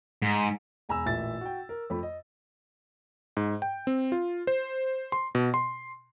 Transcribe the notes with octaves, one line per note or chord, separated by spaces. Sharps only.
G#2
E1 G#5 A#5 B5 E6
A1 A#2 E5 A6
F#4 G5
A#4
F2 A3 B5
D#5
G#2
G5
C4
F4
C5
C6
B2
C6